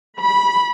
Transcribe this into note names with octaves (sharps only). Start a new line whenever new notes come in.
B5